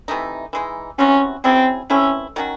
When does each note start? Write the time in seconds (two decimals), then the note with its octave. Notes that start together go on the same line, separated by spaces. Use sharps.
0.08 C3 E3 A3 D#4
0.53 E3 G#3 D#4
0.99 C3 E3 C4 C#4 F#4
1.44 F#3 C4 C#4 E4 G#4
1.90 E3 A3 C4 C#4 E4
2.36 D#3 F#3 C#4 F#4